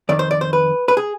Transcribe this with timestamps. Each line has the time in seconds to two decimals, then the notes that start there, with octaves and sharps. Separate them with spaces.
0.09 F2 D#3 D5
0.19 C5
0.31 D5
0.41 C5
0.53 B4
0.88 B4
0.97 G#4